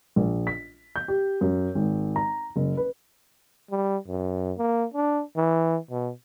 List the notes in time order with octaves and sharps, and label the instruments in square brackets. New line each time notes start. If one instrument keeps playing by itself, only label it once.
[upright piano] A#1
B6
G6
G4
F#2
G#1
A#5
F#1
B4
[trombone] G3
F#2
A#3
D4
E3
B2